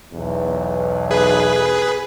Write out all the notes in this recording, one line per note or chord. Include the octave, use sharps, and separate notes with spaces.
B1 E2
G#4 B4